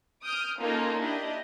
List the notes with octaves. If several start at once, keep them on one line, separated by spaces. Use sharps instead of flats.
D#6 F6 G6 D7
A#3 C#4 D#4 F4 A4 D#5
D4 E4 G4 D#5